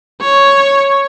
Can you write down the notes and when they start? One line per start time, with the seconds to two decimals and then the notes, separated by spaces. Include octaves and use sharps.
0.21 C#5